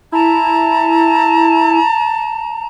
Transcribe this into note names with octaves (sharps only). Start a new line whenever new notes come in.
E4 A5 A#5